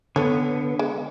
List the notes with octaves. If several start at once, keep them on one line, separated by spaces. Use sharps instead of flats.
D3 B3 A4 C#5
G#3